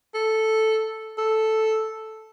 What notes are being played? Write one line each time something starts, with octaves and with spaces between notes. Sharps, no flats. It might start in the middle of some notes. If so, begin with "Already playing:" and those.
A4
A4